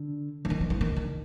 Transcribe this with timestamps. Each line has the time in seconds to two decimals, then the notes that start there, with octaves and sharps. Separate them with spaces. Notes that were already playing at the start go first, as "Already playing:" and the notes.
Already playing: D3
0.45 E3
0.50 D#3
0.61 F3
0.70 E3
0.81 D#3
0.96 D#3